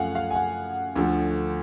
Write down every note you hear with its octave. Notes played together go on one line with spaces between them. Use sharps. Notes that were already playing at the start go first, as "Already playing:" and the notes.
Already playing: F#2 F3 A3 F5 F#5 G#5
F5
G#5
F#5
D2 D3 F3 A3